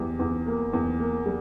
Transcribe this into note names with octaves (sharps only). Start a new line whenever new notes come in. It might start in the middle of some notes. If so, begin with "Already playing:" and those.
Already playing: E2 G3
E2
A#3
E2
A#3
G3